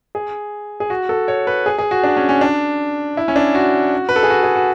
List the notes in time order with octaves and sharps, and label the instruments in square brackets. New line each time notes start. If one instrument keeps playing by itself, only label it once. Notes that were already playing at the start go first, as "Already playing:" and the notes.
[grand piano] G#4
G#4
F#4
A4
C#5
B4
G#4
G#4
F#4
D4
C#4
C#4
D4
E4
C#4
D4
F#4
B4
A4
G#4
F#4
G#4
F#4